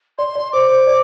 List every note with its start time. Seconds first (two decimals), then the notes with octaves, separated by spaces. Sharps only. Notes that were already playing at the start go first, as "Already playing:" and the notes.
0.18 D5 C6
0.35 D5
0.53 C5 D6
0.69 C5
0.87 D5